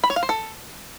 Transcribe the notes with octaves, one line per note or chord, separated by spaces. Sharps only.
B5
C#5
F5
C5
A4